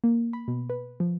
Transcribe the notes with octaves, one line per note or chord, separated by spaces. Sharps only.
A#3
B5
B2
B4
F3